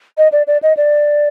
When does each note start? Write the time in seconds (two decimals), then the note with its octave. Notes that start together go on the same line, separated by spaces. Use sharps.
0.18 D#5
0.32 D5
0.47 D5
0.63 D#5
0.77 D5